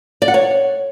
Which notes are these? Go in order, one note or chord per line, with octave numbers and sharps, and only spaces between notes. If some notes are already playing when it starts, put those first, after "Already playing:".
D5
F#5
C#5